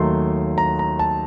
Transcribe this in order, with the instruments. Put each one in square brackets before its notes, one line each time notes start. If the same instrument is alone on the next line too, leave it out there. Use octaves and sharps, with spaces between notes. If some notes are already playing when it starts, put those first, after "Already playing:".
Already playing: [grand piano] D#2 D#3 F#3 A3 C6
A#5
A#5
A5